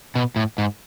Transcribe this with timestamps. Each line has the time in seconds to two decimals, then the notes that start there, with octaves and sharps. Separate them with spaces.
0.15 B2
0.36 A2
0.58 G#2